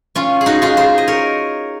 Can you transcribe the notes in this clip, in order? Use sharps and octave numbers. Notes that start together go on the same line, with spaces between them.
C#4 F4
G#4
D#4 F#4
F4 G#4
G#4 C5
D#5
A#4 C#5